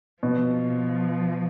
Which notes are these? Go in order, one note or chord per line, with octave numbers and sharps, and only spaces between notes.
B2 F3